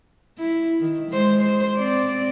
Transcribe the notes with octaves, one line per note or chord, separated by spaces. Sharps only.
E4
D#3
G#3 C5
C5
C4 D5